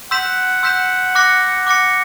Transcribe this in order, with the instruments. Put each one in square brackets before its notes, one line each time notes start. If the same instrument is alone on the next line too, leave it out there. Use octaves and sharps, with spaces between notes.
[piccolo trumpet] F#5 [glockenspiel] C6 E6 G6 B6 E7
[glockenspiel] C6 E6 G6 B6 E7
D6 F#6 A#6 C#7
D6 F#6 A#6 C#7